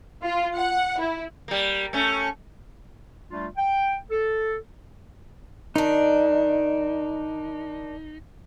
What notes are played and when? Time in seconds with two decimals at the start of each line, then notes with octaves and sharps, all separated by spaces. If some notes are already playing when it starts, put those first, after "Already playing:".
0.23 F4
0.57 F#5
1.00 E4
1.48 G3 A#3
1.93 A3 C#4
3.30 G3 A3 D4 F4
3.57 G5
4.11 A4
5.76 D#3 D4 D#4